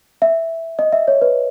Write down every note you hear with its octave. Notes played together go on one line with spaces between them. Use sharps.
E5
D#5
E5
C#5
B4